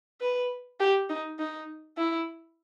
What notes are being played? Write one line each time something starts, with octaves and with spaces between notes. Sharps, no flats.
B4
G4
D#4
D#4
E4